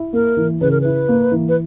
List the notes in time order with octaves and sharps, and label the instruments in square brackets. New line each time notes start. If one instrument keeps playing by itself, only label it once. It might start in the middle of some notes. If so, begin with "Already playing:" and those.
Already playing: [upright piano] E4
[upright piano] A#3 [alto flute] A#4
[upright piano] E3
[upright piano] C#3 [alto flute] B4
[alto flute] A#4
[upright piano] E4 [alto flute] B4
[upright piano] A#3
E3
[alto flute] B4